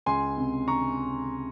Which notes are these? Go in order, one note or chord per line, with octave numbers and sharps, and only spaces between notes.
C#2 G#5 C6
C3
A#5 C#6